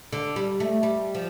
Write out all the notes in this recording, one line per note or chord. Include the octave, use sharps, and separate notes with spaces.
D3
G3
A3
G3
F3